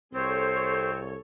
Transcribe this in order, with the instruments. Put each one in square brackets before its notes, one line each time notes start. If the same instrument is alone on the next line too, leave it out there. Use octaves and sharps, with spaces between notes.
[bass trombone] C2 [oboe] C4 [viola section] G#4 A4 C#5 [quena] C5